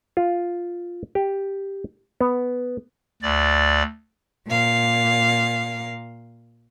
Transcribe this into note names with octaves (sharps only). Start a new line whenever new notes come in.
F4
G4
B3
D2 D5
A#2 F5